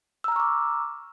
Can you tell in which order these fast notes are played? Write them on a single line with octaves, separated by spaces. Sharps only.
E6 A#5 F6 C#6 D6